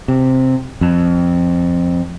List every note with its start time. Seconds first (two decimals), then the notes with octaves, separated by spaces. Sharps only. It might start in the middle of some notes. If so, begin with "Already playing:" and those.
0.08 C3
0.81 F2